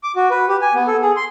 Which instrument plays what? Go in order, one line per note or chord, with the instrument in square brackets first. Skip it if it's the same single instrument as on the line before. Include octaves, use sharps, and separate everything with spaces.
[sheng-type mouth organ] D6
F#4
B4
G4
G#5
B3
A4
G#4
C6